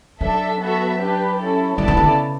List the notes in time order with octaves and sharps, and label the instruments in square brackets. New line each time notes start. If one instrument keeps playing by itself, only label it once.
[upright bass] F#3 [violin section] D4 A4 E5
[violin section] B3 F#4 A4 E5
D4 G4 B4
C#4 E4 A4
[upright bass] F#3 [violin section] B3 E4 A4 D5 A5
[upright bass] E3
D3
C#3